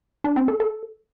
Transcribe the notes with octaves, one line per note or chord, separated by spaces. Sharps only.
D4
C4
A4
A4